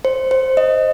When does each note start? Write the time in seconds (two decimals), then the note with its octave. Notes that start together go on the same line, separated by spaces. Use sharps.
0.05 C5
0.31 C5
0.57 D#5